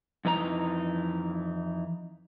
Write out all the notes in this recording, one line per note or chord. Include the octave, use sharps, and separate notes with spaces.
F2 E3 D#4 A#5